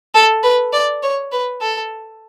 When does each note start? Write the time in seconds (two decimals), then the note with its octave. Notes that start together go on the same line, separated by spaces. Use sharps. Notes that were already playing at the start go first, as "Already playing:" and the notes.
0.15 A4
0.43 B4
0.73 D5
1.03 C#5
1.32 B4
1.61 A4